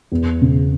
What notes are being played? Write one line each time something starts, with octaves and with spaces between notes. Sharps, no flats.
E2
C#3